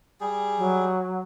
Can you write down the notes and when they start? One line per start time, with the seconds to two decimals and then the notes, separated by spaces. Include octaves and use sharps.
0.21 G3 G#4
0.58 F#3